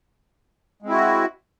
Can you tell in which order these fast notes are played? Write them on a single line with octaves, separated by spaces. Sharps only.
G#3 C4 E4 F#4